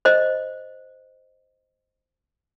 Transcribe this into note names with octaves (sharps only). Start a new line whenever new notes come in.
C5 D#5